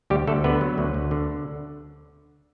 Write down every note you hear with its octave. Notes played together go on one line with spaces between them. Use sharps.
D2 G3 G4
D2 A3 A4
D3 B3 B4
F#3
D2
D2
D3